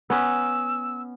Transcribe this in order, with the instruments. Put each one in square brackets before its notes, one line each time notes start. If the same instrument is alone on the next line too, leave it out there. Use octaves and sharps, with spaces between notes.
[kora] B3 C#4 B4 [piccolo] E6